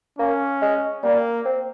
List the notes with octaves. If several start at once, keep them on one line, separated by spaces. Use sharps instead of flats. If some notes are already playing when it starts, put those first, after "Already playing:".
A#3 C#4
G#3
G3 A#3
C4